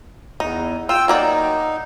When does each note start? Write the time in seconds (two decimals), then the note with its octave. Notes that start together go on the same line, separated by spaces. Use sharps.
0.40 E2 D#4
0.89 F4 G5 E6
1.08 F#3 A#3 D#4 D5